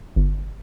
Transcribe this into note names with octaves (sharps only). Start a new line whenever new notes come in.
G1